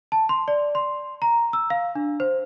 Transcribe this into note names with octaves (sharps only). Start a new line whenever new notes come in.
A5
C6
D5
C6
A#5
E6
F5
D4
C5